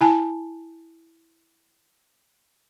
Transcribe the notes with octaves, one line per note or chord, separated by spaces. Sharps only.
E4 G#5 A5